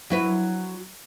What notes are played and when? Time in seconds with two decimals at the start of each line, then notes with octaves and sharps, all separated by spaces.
0.10 F#3 E4 B4